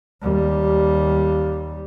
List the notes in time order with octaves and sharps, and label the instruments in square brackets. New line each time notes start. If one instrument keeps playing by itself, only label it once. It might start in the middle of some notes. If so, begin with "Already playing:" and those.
[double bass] D#2 G3